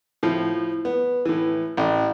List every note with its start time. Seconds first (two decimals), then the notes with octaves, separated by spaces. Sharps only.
0.23 A2 F3
0.85 B3
1.25 A2 E3
1.77 A1